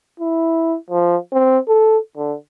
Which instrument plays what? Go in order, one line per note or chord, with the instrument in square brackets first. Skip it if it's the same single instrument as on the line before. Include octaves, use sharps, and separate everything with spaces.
[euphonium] E4
F3
C4
A4
D3